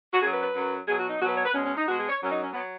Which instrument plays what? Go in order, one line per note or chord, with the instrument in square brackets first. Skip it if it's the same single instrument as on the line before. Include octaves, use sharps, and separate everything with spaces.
[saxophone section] F#4
F#2 G#4
F#3
B4
B4
F#2 F#3
B2 F#3 G#4
F#4
D#4
B2 F#3 F#4
B4
C#5
B4
B2 G#3 C#4
C#4
D#4
B2 G#3 F#4
G#4
C#5
F#2 F#3 C#4
D#4
C#4
F#3 B3